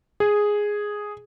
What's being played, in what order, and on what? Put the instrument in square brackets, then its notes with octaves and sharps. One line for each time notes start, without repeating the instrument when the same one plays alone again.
[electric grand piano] G#4